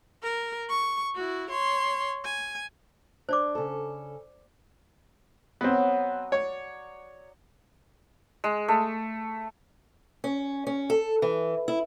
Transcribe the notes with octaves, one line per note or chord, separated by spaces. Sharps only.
A#4
C#6
E4 F#4
C#5 C6
G#5
D4 C5 D5 D6
C#3 A4
F#3 B3 C4 D#5 F#5
C#5 D5
G#3
A3
C#4
C#4
A4
E3
E4